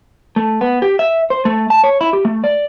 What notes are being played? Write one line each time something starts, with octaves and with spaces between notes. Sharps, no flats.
A3
B3
G4
E5
C5
A3
A5
C#5
E4
G4
A3
D5